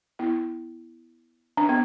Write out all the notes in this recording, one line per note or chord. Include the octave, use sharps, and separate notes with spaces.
B3 E4
D4
B3